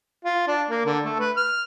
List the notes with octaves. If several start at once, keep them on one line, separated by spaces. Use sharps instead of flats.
F4
D4
A#3
D3
A3
B4
F6